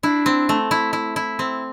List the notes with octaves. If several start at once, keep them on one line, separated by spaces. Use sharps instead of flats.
D4 E4
C4
A3
E4
E4
E4
C4